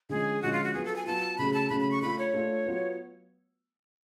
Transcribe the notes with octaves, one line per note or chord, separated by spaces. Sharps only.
D3 F3 G#3 C#4 G#4
D3 F3 G#3 C#4 F#4
F4
F#4
F#3 B3 F4 G#4
A4
G#5
F#3 B3 F4 A5
C#3 F#3 A3 C#4 G#4 B5
A5
C#3 F#3 A3 C#4 G#4 B5
B5
C#6
A3 D4 F4 A4 B5
C#5
A3 D4 F4 A4
F#3 B3 F4 B4